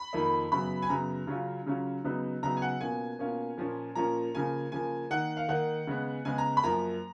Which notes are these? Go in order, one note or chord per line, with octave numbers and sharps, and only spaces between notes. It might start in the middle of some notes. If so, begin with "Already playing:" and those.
Already playing: B5
F2 D#3 A#3 D#4
F#2 C#3 F#3 B3 B5
G#5
F#2 C#3 F#3 B3 A#5
C#3 F#3 C#4 F4
C#3 F#3 C#4 F4
C#3 F#3 B3 D#4
C#3 F#3 B3 D#4 A#5
G#5
F#5
B2 A#3 C#4 F4 G#5
B2 A#3 C#4 F4
A#2 F3 A#3 C#4
A#2 F3 A#3 C#4 A#5
C#3 F3 A#3 G#5
C#3 F3 A#3 G#5
D#3 A#3 D#4 F#5
F5
D#3 A#3 D#4 F#5
C#3 G#3 B3
C#3 G#3 B3 G#5
A#5
B5
F#2 F3 A#3 A#5